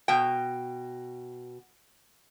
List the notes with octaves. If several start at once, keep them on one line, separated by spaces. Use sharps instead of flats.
B2 G5